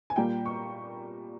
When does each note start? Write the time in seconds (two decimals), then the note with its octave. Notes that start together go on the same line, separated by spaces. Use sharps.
0.10 G#5
0.16 A#2 G3 A#3 G5
0.46 C#6